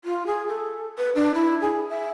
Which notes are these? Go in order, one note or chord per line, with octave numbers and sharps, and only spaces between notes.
F4
G#4
A4
B4
D4
E4
G#4
E5